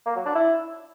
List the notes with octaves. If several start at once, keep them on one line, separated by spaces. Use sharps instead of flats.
A#3
F#3
D4
E4